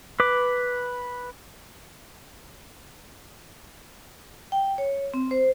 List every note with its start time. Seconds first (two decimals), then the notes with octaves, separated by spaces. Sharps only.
0.20 B4 D6
4.52 G5
4.78 C#5
5.14 C4
5.31 C5